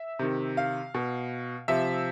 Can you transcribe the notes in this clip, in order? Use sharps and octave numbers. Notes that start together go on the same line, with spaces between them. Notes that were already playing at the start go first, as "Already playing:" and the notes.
Already playing: E5
C3 D#3
F5
B2
C3 F3 E5